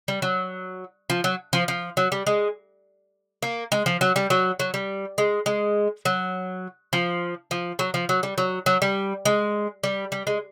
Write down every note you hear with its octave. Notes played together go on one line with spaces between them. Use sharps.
G3
F#3
F3
F#3
F3
F3
F#3
G3
G#3
A#3
G#3
F3
F#3
G3
F#3
F#3
G3
G#3
G#3
F#3
F3
F3
F#3
F3
F#3
G3
F#3
F#3
G3
G#3
G3
G3
G#3